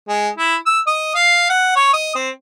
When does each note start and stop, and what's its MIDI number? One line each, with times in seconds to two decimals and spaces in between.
0.08 0.28 56
0.38 0.55 64
0.66 0.79 88
0.87 1.13 75
1.15 1.45 77
1.50 1.72 78
1.76 1.89 73
1.93 2.11 75
2.15 2.30 60